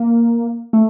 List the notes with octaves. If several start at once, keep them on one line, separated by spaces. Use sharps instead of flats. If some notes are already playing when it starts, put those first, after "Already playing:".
Already playing: A#3
A3